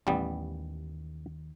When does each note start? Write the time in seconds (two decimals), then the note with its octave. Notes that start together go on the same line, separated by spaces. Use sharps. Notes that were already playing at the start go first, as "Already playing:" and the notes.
0.07 A1 D#2 G3 B3